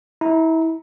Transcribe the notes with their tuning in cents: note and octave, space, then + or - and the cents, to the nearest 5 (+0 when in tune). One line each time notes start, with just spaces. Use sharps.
E4 -30 A#5 +0